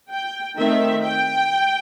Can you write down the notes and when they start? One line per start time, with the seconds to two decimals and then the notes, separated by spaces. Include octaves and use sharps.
0.10 G5
0.58 D#3 A3 C4 E5
1.04 G5